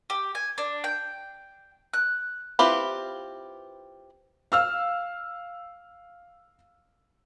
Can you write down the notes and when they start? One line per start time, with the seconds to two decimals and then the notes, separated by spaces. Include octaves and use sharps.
0.10 G4
0.35 G#5
0.58 D4
0.84 G5
1.94 F#6
2.59 C4 E4 F4 G4 B4
4.52 F5 E6 F6